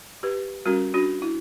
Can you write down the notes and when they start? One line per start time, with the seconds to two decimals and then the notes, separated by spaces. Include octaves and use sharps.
0.23 G4 B4
0.66 G3 C#4 F#4 A#4
0.94 D4 F#4
1.22 E4